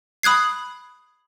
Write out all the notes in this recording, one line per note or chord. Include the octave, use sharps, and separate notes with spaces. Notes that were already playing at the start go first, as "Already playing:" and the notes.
B5 D#6 F#6 G#6 C7